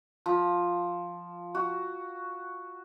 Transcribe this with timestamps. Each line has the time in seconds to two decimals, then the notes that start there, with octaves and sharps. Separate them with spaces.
0.26 F3
1.55 F#4